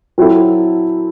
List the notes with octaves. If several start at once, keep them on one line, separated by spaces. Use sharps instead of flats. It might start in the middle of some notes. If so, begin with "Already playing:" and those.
F#3 C4 E4 A4